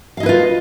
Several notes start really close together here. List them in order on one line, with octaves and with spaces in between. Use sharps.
F5 D#5 E4 B4 F4